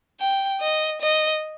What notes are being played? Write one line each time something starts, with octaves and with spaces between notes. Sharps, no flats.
G5
D#5
D#5